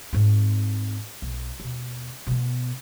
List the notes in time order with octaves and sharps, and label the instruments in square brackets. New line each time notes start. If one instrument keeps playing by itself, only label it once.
[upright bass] G#2 C4
B1
D#2 B2
B2 B3